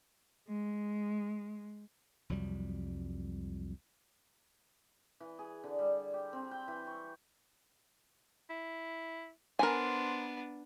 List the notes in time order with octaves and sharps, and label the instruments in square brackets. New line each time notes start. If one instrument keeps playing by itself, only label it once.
[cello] G#3
[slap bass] C2 F2 F#3 G3
[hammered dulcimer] E3
G#4
D3
G3
G4
C4
G5
E3
C#6
[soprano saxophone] E4
[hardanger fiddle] B3 D4 [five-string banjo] A#4 G#5 [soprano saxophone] C5